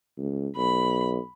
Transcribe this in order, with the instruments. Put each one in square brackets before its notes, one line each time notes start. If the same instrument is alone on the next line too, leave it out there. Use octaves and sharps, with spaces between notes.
[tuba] C#2
[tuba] B1 [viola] B5